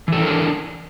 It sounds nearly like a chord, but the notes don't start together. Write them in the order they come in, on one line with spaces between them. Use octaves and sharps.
E3 A4 E4 A#4 D4